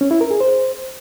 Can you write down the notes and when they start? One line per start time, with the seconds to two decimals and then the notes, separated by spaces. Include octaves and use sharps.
0.01 C#4
0.11 E4
0.21 A#4
0.31 G#4
0.40 C5